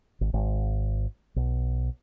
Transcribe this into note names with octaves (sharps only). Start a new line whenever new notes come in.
G#1
G#1
B1